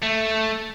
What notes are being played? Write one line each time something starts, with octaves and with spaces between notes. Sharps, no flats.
A3